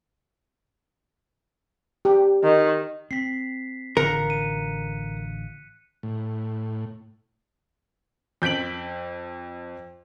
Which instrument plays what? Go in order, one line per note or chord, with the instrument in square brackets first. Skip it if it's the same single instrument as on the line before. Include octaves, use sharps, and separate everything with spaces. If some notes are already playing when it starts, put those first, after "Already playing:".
[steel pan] G4
[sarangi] D#3
[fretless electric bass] C4 [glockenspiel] B6 C7
[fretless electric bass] A1 D3 F3 [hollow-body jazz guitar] A#4 [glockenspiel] F#6 C#7
[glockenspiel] D#7
[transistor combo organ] A2
[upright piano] F2 G6 B6 D7 F#7